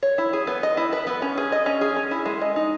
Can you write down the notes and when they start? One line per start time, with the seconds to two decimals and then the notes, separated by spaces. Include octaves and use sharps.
0.03 C#5
0.18 E4
0.33 G#4
0.47 B3
0.63 D#5
0.77 E4
0.93 B4
1.07 B3
1.22 C#4
1.38 G#4
1.52 D#5
1.66 C#4
1.81 G#4
1.96 C#4
2.11 E4
2.26 G#3
2.41 D#5
2.56 D#4